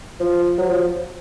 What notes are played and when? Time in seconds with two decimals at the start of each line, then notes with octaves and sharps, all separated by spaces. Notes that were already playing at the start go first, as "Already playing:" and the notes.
0.20 F3
0.58 F#3
0.69 F3